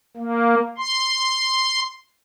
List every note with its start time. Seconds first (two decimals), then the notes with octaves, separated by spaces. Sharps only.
0.17 A#3
0.78 C6